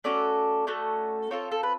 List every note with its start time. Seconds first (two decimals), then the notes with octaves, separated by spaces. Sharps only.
0.04 A3 C#4 F#4 A4 D5
0.67 A3 C#4 F#4 A4
1.31 C4 F4 A4 C#5
1.51 A4
1.63 B4